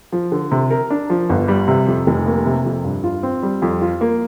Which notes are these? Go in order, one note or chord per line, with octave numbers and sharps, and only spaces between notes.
F3
D3
C3
A#4
D4
F3
G1
G3
C3
F2
F1
A#3
C3
F2
G2
F4
C4
G3
F2
F4
A#3